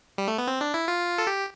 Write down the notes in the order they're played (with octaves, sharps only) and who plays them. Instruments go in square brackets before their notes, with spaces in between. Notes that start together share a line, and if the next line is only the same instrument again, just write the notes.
[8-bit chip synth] G3
A3
B3
C4
D4
E4
F4
A4
G4